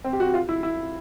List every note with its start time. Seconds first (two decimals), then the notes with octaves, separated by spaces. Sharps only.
0.04 C4
0.13 G4
0.20 F#4
0.34 F4
0.49 E4
0.63 E4